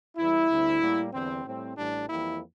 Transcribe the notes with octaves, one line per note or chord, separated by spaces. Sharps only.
E2 E3 G3 E4
D2 D3 G3 C4
A2 G3 A#3
E2 D3 G3 C4
A2 G3 C4
A1 A2 E3 G3 D4
F2 E3 G3 A#3 E4